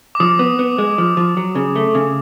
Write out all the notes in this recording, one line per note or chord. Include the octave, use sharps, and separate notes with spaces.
D6
F3 D#6
B3
B3
G#3
F3
F3
F#3
C#3
A3
C#3